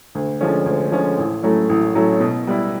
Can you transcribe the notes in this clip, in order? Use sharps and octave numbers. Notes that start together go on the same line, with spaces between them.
D2
D3 F3 G#3 C#4
D2
D3 F3 G#3 C#4
A1
A2 F#3 A3 C#4
A1
A2 F#3 A3 C#4
B2
G3 B3 E4